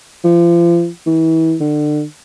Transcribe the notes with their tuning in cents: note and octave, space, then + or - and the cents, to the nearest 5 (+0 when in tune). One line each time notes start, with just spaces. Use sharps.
F3 -35
E3 -30
D3 +30